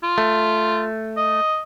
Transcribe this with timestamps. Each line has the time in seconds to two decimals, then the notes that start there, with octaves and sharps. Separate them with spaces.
0.03 F4
0.18 A3
1.17 D#5